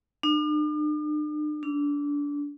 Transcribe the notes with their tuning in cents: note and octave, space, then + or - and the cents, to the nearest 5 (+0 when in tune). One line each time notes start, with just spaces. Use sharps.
D4 +45
D4 -25